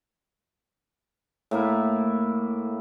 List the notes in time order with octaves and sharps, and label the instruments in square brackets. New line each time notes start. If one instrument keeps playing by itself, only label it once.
[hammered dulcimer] A2 A#3 E4